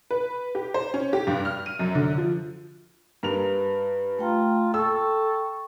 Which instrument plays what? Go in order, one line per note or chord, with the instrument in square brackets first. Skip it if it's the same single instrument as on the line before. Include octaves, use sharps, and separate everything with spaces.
[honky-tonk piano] B4
G4
C5
C#4
G4
G2
F6
D#7
F#2
D3
F3
[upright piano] G2 A#4 F7 [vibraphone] B4
[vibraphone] A3 G5 A#5 [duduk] F4
[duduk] A4 [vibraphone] G5 C#6 [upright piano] E6